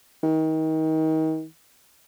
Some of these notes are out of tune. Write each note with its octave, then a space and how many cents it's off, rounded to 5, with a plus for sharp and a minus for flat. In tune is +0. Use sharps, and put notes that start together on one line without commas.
D#3 +30